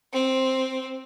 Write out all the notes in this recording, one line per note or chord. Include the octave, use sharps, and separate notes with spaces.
C4